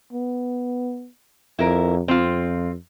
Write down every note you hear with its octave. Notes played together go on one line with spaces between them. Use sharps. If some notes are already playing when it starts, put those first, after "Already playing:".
B3
F2 E4 A#4
F2 C4 F4